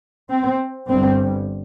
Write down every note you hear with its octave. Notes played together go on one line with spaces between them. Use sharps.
C4
G1 G2 C4